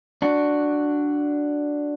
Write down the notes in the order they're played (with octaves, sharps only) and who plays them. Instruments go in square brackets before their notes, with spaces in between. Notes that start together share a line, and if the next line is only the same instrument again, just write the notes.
[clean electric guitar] D4 F#4